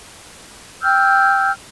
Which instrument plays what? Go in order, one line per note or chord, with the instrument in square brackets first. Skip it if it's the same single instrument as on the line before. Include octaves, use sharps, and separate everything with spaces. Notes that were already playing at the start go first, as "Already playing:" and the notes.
[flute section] G5 E6 F6 G6